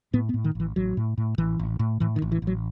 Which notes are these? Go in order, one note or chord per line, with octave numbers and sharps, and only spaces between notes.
A2 B3
B3
A2
D#3
A1 E3
A1 F#3
A2
A2
A1 E3
A1
A2
A2 E3
D#3
A1
E3
A1
F#3